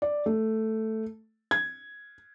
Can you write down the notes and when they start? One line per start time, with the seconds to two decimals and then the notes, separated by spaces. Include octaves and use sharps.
0.02 D5
0.26 A3
1.51 G#6